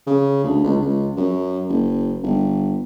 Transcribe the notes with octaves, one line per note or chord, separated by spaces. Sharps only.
C#3
D2
C#2
C#2
F#2
F#1
G1